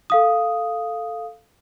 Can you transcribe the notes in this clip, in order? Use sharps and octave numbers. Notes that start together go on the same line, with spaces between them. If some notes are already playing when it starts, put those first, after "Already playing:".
A4 F5 D#6